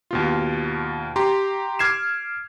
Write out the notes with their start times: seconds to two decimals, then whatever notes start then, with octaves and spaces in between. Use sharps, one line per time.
0.11 D#2 B2 F4
1.16 G4 A#5 C6
1.79 D6 F6 G#6 C7 E7